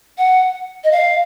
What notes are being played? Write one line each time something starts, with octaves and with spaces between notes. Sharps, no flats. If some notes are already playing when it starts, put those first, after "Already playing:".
F#5
D#5
F5